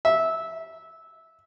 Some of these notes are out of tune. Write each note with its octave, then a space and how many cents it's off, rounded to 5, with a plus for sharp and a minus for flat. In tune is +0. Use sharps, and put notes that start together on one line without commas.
E5 -15